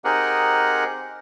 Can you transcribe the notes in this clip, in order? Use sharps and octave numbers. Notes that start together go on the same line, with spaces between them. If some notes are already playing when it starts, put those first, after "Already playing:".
C4 D#4 G4 G#4 A#4 F#5